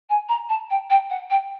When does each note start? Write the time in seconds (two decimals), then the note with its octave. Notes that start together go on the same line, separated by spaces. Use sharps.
0.09 G#5
0.28 A#5
0.49 A5
0.70 G5
0.90 G5
1.10 F#5
1.30 G5